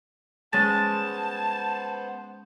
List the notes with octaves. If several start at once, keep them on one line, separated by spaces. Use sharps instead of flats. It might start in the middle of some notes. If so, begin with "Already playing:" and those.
G#3 B3 C#4 C5 A5 A6